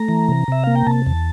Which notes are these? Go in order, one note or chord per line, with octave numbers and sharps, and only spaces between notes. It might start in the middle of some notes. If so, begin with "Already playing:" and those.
Already playing: A3 A#5
E3
C3
C3 E5
A#3 F5
G5
C3 A5
E2